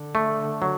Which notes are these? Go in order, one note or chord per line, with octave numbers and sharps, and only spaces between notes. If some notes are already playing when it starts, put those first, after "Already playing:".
Already playing: D3
A3
F#3